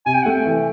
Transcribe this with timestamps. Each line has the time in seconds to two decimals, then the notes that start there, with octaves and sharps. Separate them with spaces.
0.06 C3 G#5
0.14 G5
0.22 F#5
0.26 A3 G5
0.45 E3